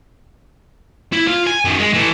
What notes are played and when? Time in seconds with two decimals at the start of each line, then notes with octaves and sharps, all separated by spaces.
1.12 E4
1.28 F4 F5
1.47 G#5
1.65 F#2 D#3
1.79 G#3
1.94 E3 A3